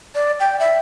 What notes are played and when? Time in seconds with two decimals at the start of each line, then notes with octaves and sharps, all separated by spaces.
0.15 D5
0.40 G5
0.59 E5